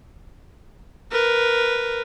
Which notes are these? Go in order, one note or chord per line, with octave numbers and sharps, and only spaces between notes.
A#4 B4